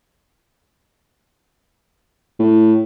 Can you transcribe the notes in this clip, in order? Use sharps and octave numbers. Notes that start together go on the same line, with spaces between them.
A2